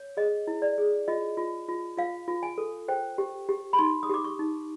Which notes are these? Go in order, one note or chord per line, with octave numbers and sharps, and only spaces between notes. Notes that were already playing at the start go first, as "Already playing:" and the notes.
Already playing: C#5
G#4 D#5
E4
D5
G#4
F4 D#5
F4
F4
F4 F5
F4
G#5
A4
C5 G5
G4
G4
B5
D#4 C6
D#6
G4 D6
C#6
D#4